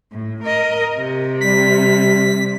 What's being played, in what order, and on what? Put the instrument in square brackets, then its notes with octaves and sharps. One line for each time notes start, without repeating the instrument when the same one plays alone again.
[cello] A2
A#4 D#5
C3
[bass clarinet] G3 [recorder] B6